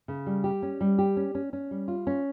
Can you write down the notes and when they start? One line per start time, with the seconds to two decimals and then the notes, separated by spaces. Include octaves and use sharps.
0.08 C#3
0.26 G3
0.44 G4
0.63 C#4
0.81 G3
0.98 G4
1.17 C#4
1.35 C#4
1.53 C#4
1.71 G3
1.88 F4
2.07 C#4